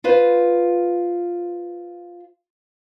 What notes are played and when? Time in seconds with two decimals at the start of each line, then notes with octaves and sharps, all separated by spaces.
0.04 F4 B4 C5 F5